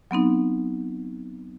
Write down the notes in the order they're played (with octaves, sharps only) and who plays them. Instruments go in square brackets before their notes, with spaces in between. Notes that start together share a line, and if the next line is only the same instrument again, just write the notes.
[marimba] F#3 B3 C4 D#4